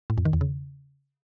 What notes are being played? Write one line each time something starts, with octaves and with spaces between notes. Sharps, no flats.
A2
F2
D#3
E2
C#3